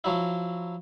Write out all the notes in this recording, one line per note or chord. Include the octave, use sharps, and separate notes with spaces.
F3 F#3 E4